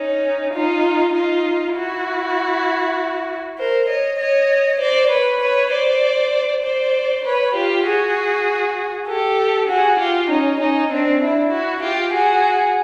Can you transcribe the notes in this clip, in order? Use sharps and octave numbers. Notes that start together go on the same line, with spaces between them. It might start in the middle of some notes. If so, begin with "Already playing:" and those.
Already playing: C#4 D#4
D#4 F4
D#4 F4
E4 F#4
A#4 C5
C#5 D#5
C#5 D#5
C5 D5
B4 C#5
B4 C#5
C5 D5
C5 D5
B4 C#5
F4 G4
F#4 G#4
G4 A4
F#4 G#4
F4 G4
C#4 D#4
C#4 D#4
C4 D4
D4 E4
E4 F#4
F4 G4
F#4 G#4